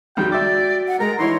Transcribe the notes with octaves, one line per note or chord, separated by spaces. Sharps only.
C#2 D#3 G3 F#4 G5
D5 E5 G5 D6
F#5
G#3 A#4 A#5
E3 D#4 E4 C#5 C6